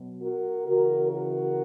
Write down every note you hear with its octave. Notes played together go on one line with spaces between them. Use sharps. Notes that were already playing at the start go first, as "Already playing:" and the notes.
Already playing: B2 F#3
F#4 A#4
C#3 E3 F#4 A#4
F#4 A#4